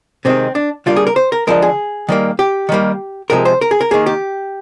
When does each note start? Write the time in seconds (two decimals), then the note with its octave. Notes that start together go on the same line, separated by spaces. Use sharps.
0.25 C3 D#3 G#3 C4
0.55 D4
0.86 D3 G3 A#3 F4
0.96 G#4
1.07 A#4
1.16 C5
1.32 A#4
1.47 D3 F3 G#3 A#4
1.63 G#4
2.09 D#3 G3 A#3
2.39 G4
2.69 D#3 G3 A#3
3.30 C3 F3 G#3 A#4
3.45 C5
3.61 A#4
3.71 G#4
3.81 A#4
3.91 D#3 A#3 G#4
4.06 G4